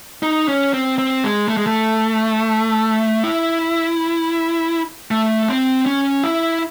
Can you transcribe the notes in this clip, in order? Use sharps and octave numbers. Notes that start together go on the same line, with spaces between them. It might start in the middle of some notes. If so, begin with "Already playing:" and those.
D#4
C#4
C4
C4
G#3
A3
G#3
A3
E4
A3
C4
C#4
E4